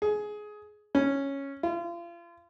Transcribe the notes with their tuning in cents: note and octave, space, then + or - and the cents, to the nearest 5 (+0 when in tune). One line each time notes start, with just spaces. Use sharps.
G#4 +15
C#4 -5
F4 -35